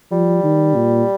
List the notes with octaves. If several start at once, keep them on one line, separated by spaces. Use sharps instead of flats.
F3 G3
D#3
A#2